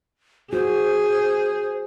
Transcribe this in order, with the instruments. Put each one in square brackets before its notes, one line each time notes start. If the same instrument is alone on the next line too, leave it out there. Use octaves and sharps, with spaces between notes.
[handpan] F#4 [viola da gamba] G#4 [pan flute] C5